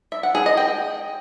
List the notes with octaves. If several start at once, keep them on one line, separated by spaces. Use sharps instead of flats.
E5
F#5
G#4
D#5
G5